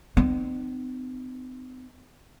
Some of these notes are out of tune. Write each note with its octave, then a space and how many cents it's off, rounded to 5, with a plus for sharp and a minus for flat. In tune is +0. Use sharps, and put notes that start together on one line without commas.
C4 -45 D#4 -45